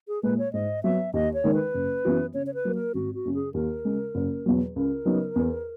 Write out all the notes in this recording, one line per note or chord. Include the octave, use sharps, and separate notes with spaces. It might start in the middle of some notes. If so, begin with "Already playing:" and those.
G#4
A#2 G#3 B4
C#5
G#2 D#5
F#3 B3 E5
D#2 D#5
C#5
D#3 G#3 D#4 A#4
B4
F#1
F#2 E3 B3 F#4
C#3 C#5
C#5
B4
F#3 A#3
A#4
G#1 F#4
F#4
F#2 C#3
G#4
D#2 A#4
C#3 G#3
F#1
E2 B2 F#3
C#2 A#4
C#3 F#3 B3 D#4
E2